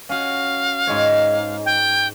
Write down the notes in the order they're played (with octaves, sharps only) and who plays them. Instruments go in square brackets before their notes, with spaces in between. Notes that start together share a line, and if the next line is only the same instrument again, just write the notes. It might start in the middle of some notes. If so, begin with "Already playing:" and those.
[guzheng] C#4 F#4 [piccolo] F5
[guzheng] G#2 G#3 C#5
[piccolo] G5